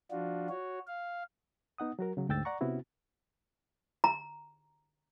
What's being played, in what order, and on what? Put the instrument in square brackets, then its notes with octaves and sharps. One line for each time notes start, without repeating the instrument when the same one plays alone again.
[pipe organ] F3 D4 F4 F#4
F#4 C#5
F5
[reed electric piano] B3 D#4 F#5 D#6
F#3 F#4 A#4
C#3 F#3
D2 G#2 G5 E6 A6
D5 F#5 A#5 C#6
C3 B3 C#4 E4 F#4
[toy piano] A#5